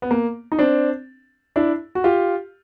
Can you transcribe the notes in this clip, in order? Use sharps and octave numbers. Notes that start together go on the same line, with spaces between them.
B3
A#3
D#4
C4 D4
D4 E4
F#4
F4 G4